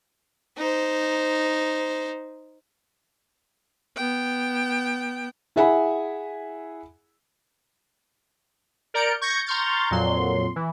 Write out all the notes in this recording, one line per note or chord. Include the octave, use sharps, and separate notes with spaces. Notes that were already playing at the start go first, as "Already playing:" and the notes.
D#4 C5
B3 G5
E4 G#4 E5 F#5 G#5 B5
A#4 D5 A#5 G6 C#7 D7
C#6 G6 G#6 A#6 C#7
A#5 C6 C#6 F6 G6 A6
F2 A#2 F#3 C6
E3